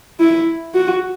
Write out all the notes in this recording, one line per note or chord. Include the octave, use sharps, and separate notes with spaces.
E4
F#4